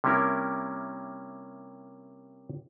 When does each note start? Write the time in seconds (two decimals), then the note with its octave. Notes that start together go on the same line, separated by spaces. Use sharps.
0.04 C3 G3 A#3 C#4 E4 A#4